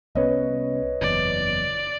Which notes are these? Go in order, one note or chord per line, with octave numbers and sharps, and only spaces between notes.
C2 B3 C#4 B4 C#5 D#5
F#1 E2 D5